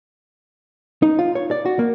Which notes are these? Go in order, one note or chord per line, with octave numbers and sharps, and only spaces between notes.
D#4
F4
C#5
D5
F#4
A#3